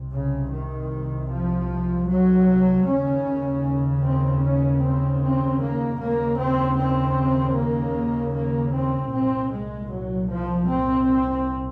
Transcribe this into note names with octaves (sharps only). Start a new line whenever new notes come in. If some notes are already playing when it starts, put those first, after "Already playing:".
Already playing: C2 C3
C#3
D#3
F3
F#3
D#2 C#3 C#4
C4
C#4
C4
C4
A#3
D#2 C#3 A#3
C4
C4
A#3
A#3
C4
C2 A#2 C4
G#3
F#3
F3
C4